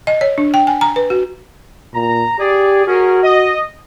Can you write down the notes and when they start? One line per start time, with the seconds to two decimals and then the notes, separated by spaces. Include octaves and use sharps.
0.07 D#5
0.21 C#5
0.38 D4
0.54 G5
0.67 G#5
0.81 A#5
0.96 B4
1.10 F#4
1.94 A#2 A#5
2.39 G4 G#4 D5
2.87 C#4 F#4 G#4 A#4
3.23 D#5